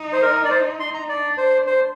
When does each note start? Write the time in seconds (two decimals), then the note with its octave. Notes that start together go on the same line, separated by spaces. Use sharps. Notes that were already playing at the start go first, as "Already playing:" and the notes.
Already playing: D#4
0.12 C5
0.22 A#4
0.45 D5
0.50 C5
0.80 C6
0.94 A#5
1.09 D4 D5
1.38 C5
1.67 C5